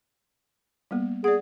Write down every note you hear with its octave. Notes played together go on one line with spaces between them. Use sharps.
G3 A#3 B3
G#4 D5 F#5